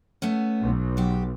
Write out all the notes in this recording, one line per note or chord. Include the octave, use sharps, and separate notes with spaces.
A3 B3 C#4
B1
F#3 G4